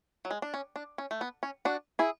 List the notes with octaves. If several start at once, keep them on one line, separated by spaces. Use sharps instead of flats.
F#3
G#3
D4
C#4
D4
C#4
A3
B3
C#4
D4 F#4
E4 G#4